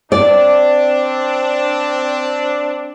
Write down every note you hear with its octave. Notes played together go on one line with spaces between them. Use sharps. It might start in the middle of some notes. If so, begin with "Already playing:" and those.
C4 D4 D5